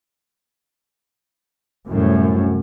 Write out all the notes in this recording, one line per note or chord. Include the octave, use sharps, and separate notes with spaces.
C2 F#2 A2